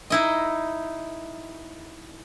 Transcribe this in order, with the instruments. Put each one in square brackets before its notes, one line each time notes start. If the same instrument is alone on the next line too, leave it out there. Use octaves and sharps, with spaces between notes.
[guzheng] D#4 E4 D#5